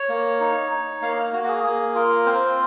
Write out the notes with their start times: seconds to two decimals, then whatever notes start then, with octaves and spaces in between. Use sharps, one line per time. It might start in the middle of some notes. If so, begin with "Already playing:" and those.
Already playing: C#5
0.09 A#3
0.40 D#4
0.71 D#4
1.02 A#3 F5
1.33 A#3 F#4
1.44 F#4
1.48 G#4
1.64 A#3 G#4
1.95 F4 A#4
2.26 C4 C5